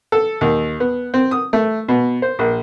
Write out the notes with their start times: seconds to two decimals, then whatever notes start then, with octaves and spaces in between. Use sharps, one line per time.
0.12 A4
0.41 D#2
0.80 B3
1.14 C4
1.31 D#6
1.53 A3
1.88 B2
2.22 C5
2.39 A#1